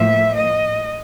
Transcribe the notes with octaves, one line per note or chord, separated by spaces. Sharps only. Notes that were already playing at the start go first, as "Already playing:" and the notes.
Already playing: A2 F3 A#3 E5
D#5